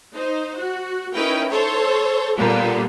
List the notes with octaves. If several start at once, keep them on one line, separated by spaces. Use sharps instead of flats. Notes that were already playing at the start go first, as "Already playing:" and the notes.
D#4 C5
F#4
C#4 D#4 E4 A#4 B4 G5
A4 C5 C#5
A#2 D3 G3 A#3 B3